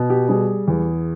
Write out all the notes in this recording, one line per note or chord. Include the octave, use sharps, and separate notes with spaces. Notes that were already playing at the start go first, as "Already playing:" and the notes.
Already playing: B2
G4
G3 G#4
E2